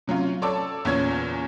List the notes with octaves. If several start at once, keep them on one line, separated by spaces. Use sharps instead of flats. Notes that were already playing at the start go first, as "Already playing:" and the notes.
C3 F#3 C#4 F4
A4 C#5 D5 A5 D6 E6
E2 A#2 C#3 C#4 C#5 G#6